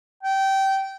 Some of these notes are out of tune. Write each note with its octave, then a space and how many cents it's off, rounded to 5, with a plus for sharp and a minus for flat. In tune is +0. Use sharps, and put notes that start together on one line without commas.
G5 -20